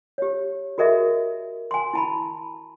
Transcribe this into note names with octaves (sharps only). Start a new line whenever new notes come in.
G4 C#5
F#4 G#4 A#4 D#5 E5
G#5 C6
E4 A5 B5